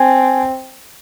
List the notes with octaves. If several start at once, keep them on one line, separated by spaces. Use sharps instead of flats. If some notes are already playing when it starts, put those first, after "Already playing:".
Already playing: C4 G#5